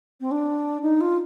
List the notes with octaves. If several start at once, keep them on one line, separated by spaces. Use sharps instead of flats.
C4
D4
D#4
F4